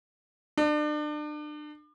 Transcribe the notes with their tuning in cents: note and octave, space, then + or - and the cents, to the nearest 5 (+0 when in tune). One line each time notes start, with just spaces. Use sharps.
D4 +35